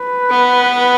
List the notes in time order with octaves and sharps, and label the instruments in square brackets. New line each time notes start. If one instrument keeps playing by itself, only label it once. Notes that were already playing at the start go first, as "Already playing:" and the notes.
Already playing: [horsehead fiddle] B4
[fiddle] B3